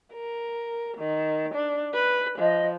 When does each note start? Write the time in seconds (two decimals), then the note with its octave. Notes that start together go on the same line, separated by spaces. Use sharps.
0.13 A#4
0.97 D#3
1.55 D4
1.94 B4
2.39 F3 D#5